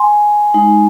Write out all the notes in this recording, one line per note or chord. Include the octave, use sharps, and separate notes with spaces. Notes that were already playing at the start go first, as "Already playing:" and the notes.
Already playing: G#5 C6
G#3 D#4